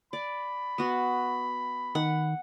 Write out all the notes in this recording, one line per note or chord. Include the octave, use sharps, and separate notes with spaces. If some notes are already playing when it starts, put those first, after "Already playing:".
D5 B5
B3 F#4
D#3 F#5